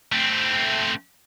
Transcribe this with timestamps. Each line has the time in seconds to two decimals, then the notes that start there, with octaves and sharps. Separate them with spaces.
0.12 A3 C4